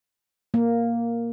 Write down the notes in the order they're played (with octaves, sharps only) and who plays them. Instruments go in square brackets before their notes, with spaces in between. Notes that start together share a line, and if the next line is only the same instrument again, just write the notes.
[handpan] A#3